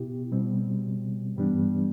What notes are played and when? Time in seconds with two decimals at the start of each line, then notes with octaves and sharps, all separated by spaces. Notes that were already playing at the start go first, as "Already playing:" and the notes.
Already playing: B2 B3 E4 G4
0.32 B2 G3 C4
1.36 G2 E3 G3 B3 D4